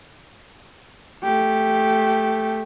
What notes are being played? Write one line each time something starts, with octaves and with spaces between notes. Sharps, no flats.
A3 G4